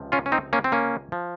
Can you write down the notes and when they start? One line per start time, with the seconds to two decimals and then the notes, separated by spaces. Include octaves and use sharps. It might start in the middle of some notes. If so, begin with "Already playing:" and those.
Already playing: C#2 C3 F3
0.12 C#4 F4
0.26 C#4
0.32 C4 D#4
0.53 A#3 C#4
0.64 C4
0.72 A#3 C#4
1.12 F3